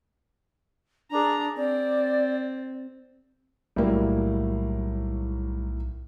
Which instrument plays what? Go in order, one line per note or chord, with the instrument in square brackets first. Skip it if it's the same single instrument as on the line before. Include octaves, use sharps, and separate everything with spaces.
[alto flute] D4 [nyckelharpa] G#4 A#5
[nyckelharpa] C4 [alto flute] D5
[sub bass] B1 [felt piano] A2 F#3 A#3 [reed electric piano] G3 E4